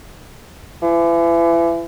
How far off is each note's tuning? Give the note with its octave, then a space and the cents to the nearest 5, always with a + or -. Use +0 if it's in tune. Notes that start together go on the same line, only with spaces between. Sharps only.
E3 +35